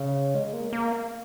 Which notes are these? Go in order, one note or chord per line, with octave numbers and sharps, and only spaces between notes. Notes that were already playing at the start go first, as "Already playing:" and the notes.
Already playing: C#3
G#3
A#3
A#3